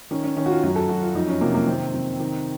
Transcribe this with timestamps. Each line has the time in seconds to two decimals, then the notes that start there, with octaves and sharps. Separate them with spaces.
0.11 D#3 C#4
0.24 C#4
0.37 D#3 C#4
0.46 F#4
0.50 F4
0.63 F#2 F#4
0.76 A4
0.89 F#2 F#4
1.02 F4
1.14 F2 D#4
1.28 C#4
1.41 C3 A#3
1.54 A#3
1.67 D#3 C4
1.94 C3
2.20 D#3